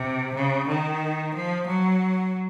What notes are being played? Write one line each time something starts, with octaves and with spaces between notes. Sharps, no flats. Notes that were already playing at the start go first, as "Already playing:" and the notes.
Already playing: C3
C#3
D#3
F3
F#3